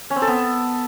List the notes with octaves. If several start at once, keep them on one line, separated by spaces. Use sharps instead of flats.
C#4
C4
A4
B3